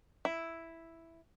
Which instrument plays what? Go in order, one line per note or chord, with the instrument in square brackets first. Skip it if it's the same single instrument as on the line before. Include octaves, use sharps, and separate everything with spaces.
[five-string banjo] E4